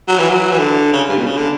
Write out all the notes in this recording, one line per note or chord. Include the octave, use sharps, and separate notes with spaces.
F#3
E3
F#3
E3
D3
C#3
G2
B2
C#3
D3